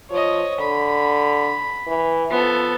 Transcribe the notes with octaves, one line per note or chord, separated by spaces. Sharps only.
F3 C#5 D#5
D3 B5
E3
F3 B3 A4